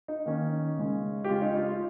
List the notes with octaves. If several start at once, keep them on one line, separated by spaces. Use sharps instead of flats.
D#4
D#3 A#3 C#4
C#3 G#3 C#4
G4
C#3 G#3 C#4 F4
D#4
F4
F4